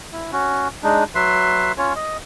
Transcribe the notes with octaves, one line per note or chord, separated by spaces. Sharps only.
E4
C#4 F#4
G#3 D4 D#4
F#3 B4 E5 C6
C#4 F4 C#5
D#5